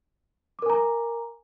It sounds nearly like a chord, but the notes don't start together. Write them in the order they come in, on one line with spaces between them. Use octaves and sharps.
D6 A#4 G#5 A#5